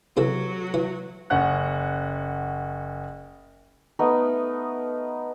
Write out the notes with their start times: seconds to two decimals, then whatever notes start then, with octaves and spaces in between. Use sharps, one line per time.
0.17 C3 E3 F#3 F#4 A4
0.74 E3
1.30 F#1 C#4 F#5 F#6
3.99 A3 B3 D#4 A#4